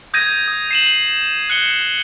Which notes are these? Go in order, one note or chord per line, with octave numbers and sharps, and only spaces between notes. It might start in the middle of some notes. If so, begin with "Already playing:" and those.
D#6 G6 G#6 A#6 D#7
D#6
C7 E7 F#7
F#6 C#7 G7